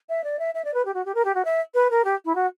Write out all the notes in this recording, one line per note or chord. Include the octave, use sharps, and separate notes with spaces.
E5
D5
E5
E5
D5
B4
G4
F#4
G4
A#4
G4
F#4
E5
B4
A#4
G4
E4
F#4